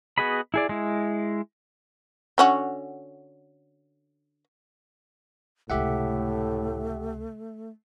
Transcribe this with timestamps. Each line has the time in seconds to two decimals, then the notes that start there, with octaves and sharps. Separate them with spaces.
0.18 B3 F#4 G#4 D#5 B5
0.54 E4 G#4 D5
0.69 G#3 E4
2.38 D3 C#4 F#4
5.70 C#2 A2 C3 A3 G4 E5 F#5